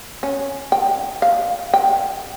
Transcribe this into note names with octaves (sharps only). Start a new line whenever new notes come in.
C#4
G5
F5
G5